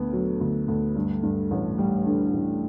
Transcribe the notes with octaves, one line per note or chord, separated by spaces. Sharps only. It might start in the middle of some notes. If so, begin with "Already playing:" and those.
Already playing: D2 B3
F#3
D2
D2
G2
G2
A1
G3
D3
A1